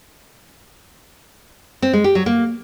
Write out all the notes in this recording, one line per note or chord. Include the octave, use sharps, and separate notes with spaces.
C4
G#3
G4
F#3
A#3